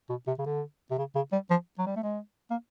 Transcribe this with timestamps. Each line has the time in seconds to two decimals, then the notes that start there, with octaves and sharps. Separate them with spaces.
0.10 B2
0.27 C3
0.38 C#3
0.46 D3
0.91 C3
0.98 C#3
1.15 C#3
1.32 G3
1.50 F3
1.79 F#3
1.86 G3
1.96 A3
2.03 G#3
2.51 A#3